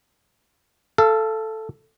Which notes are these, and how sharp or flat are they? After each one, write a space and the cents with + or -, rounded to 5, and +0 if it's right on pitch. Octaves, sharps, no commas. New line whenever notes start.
A4 +0 F5 -35